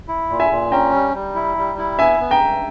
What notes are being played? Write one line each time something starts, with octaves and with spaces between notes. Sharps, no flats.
E4
A#2
E5 G#5
A#2
C#4 G5 A#5
G3
G3
E4
G3
E4
B3 E5 G#5
B3
G5 A#5
G2